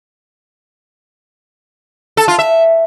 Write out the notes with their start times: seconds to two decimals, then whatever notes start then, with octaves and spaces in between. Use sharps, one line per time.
2.17 A4
2.28 F4
2.39 E5